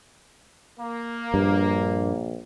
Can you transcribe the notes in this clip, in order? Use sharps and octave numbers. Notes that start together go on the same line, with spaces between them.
A#3
A#1 G2